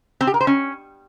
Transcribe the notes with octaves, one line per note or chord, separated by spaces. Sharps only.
C4
G4
A#4
C5
C#4